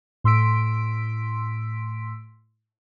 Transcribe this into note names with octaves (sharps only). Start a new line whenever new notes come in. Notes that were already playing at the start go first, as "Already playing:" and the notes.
A2 C6 E6 B6 D7